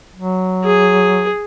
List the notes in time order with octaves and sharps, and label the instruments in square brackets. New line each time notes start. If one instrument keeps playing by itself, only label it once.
[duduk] F#3
[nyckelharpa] G#4